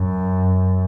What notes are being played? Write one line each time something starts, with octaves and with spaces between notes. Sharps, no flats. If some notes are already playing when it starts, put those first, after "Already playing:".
Already playing: F#2